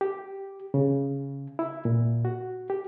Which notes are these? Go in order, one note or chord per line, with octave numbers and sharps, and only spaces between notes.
G4
C#3
E4
A#2
F#4
G4